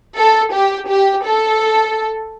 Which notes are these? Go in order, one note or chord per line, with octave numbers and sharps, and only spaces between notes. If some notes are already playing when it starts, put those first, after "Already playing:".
A4
G4
G4
A4